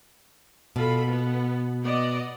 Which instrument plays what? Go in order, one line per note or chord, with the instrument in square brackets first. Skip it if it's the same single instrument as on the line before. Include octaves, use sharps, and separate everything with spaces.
[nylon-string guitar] B2 [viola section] F4 A4 B5
[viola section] B3
B3 D5 D#5